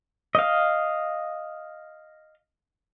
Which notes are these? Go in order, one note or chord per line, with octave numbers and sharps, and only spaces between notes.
D#5 F5